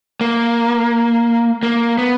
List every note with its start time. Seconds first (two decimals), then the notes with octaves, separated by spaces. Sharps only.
0.21 A#3
1.63 A#3
1.98 B3